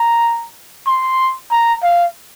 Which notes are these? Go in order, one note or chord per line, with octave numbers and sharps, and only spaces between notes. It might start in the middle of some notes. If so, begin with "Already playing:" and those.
Already playing: A#5
C6
A#5
F5